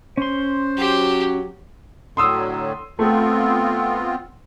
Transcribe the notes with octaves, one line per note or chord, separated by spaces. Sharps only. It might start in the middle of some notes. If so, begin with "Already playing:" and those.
C#4 C5 C6
F#3 G4
A2 D3 F#3 C6 D#6 E6
A3 B3 C4 F4